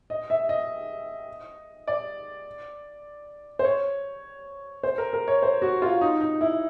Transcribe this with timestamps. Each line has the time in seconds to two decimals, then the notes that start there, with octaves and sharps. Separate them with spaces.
0.10 D#5
0.30 E5
0.49 D#5
1.87 D5
3.59 C5
3.65 C#5
4.83 C5
4.98 A#4
5.13 A#4
5.28 C#5
5.42 C5
5.62 F#4
5.82 F4
6.01 D#4
6.21 D#4
6.41 E4